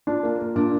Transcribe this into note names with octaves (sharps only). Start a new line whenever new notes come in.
D4 F4
A#3
A#3
A#2 D4